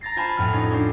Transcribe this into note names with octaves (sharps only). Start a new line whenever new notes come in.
A#5 A6 A#6 C7
F4 C5 G#5 A5 B5
F2 A2 B3 F6
C#4 D#4
C#4 D4 C5